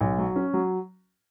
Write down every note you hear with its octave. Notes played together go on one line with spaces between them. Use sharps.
B1
F#3
C#4
F#3